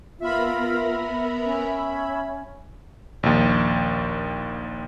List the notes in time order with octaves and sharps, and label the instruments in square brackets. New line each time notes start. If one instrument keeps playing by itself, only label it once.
[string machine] B3 A#4 A#5 [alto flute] F4 [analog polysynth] E5 B5
[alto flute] C#4
[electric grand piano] A#1 D#2